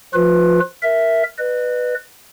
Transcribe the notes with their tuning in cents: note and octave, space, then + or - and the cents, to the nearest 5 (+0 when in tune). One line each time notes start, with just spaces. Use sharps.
F3 +0 F4 +35 B4 +0
A#4 +0 E5 +0
B4 +0 D#5 -40